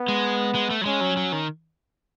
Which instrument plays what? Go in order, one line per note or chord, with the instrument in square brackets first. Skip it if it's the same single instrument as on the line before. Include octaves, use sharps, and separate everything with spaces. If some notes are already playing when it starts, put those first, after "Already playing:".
Already playing: [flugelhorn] B3
[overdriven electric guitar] G#3
G#3
A3
F#3
[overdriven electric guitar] G#3 [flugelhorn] C#4
[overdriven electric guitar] F#3
F#3
D#3